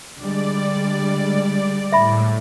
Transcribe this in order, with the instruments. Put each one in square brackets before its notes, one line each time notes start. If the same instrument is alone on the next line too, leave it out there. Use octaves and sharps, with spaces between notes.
[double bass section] D3 G3 G#3 [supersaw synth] D5
[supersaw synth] A2 [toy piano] E5 B5